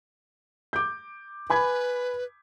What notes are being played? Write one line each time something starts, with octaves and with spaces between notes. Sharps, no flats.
D6 G6
B4 G#5 B5 G#6